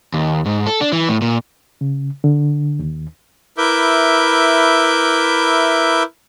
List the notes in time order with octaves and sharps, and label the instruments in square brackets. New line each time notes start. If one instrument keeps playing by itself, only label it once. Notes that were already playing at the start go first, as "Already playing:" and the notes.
[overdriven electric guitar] D#2
G#2
A4
D4
E3
A2
A#2
[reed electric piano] C#3
D3
D#2
[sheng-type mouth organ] E4 A#4 B4 E5 D6 G6